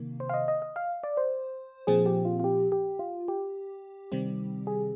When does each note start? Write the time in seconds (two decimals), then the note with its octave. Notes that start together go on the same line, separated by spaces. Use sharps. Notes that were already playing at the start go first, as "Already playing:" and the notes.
Already playing: C3 D#3 A#3
0.20 C5
0.29 F5
0.34 D#5
0.48 D#5
0.62 D#5
0.76 F5
1.04 D5
1.17 C5
1.87 A#2 F3 C4 G#4
2.06 G4
2.25 F4
2.40 F4
2.44 G4
2.72 G4
2.99 F4
3.28 G4
4.12 C3 D#3 G3 C4
4.67 G#4